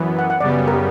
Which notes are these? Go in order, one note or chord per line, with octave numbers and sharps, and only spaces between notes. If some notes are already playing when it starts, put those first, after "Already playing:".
Already playing: F#2 E3 B3
F#5
F#5
F#2 C#3 G3 B3 D5
A#4
G4